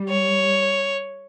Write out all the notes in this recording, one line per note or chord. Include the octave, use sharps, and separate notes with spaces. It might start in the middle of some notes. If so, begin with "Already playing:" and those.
Already playing: G3
C#5